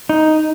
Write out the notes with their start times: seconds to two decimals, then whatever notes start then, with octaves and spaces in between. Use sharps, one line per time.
0.09 D#4